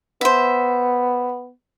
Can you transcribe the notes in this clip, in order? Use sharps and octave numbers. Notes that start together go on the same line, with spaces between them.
B3 C5 E5